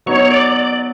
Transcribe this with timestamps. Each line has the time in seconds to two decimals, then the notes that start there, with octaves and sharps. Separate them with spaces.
0.06 F#3 B3 D#4 C#5
0.25 C#5
0.32 D5
0.56 D5